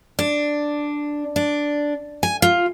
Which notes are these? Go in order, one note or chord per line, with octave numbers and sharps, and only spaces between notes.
D4
D4
G#5
F4